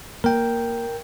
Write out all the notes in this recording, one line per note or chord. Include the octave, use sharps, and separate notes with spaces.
A#3 A#4 G5